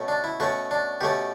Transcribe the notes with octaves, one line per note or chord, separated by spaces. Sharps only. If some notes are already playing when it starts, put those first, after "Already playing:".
Already playing: B2 A3 C#4
D4
E4
B2 A3 C#4 F#4
D4
B2 A3 C#4 G4